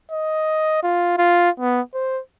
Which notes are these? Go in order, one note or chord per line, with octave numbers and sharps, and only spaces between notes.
D#5
F4
F4
B3
C5